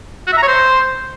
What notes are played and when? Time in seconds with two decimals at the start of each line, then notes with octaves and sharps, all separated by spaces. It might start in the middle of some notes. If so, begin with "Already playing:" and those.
0.27 F#4
0.32 E5
0.37 A#5
0.43 C#5
0.48 C5